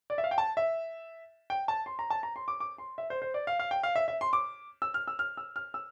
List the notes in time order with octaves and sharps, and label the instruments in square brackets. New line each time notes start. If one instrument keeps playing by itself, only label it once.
[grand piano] D5
E5
F5
G5
A5
E5
G5
A5
C6
A#5
A5
A#5
C6
D6
D6
C6
E5
C5
C5
D5
F5
F5
G5
F5
E5
E5
C6
D6
E6
F6
E6
F6
E6
F6
E6